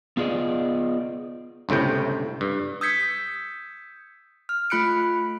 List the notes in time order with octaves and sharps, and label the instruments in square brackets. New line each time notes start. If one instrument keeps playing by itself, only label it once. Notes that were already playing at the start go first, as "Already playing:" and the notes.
[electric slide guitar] B3 F4 G#4 D5 D#5
[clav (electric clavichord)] G1 C#2 A2 C3 G5
G2
[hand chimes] D#6 E6 G6 G#6 B6 C#7
F6
A3 F4 B5 F#6 C#7 D7